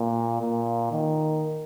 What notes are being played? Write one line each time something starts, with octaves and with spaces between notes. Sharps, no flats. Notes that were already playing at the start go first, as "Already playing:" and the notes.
Already playing: A#2
A#2
D#3